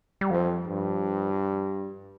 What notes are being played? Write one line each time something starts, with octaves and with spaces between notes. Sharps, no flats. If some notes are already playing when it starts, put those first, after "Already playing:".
G3
F2 F3
G2